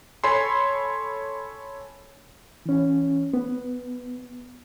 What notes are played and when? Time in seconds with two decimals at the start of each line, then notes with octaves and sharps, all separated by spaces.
0.24 A4 C#5 G#5 B5 C6
2.66 E3 C#4
3.34 B3